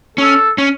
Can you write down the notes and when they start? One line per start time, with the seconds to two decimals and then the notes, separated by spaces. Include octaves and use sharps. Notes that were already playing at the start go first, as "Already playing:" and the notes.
0.17 C#4 A4
0.58 C#4